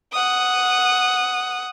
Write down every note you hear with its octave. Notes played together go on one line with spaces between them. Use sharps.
F#5 D#6